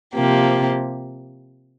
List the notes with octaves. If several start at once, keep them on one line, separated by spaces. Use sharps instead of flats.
C3 F3 A#3 G4